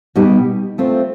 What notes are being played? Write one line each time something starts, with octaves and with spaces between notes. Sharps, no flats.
B2 G3 B3 D#4 G4
A3 C4 F4